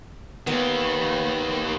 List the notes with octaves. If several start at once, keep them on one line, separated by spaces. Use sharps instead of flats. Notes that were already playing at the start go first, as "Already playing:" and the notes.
D#2 D#3 B3